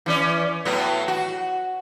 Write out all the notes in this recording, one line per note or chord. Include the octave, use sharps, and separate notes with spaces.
E3 C#4 D5
A2 F#3 B3
F#4